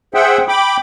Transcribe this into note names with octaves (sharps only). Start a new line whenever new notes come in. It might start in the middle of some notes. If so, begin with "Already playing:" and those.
G#4 C5 E5 F#5 G5
G5 B5 D6